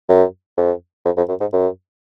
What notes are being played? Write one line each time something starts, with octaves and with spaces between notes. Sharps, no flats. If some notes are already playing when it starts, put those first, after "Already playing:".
F#2
F2
F2
F2
F#2
G#2
F#2